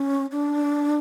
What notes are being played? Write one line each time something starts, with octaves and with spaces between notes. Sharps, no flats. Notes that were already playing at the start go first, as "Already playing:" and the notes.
Already playing: C#4
D4